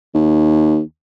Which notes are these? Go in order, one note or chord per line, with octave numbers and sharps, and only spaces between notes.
D#2